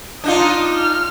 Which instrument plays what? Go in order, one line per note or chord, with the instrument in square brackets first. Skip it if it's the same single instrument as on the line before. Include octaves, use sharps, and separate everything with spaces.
[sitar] D4 D#4 F4 [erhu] D#6
[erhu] F6